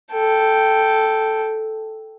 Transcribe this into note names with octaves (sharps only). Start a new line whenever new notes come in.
A4 G5